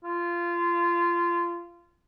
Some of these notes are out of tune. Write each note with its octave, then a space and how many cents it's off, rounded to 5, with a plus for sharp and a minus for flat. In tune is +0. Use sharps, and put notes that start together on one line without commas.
F4 -20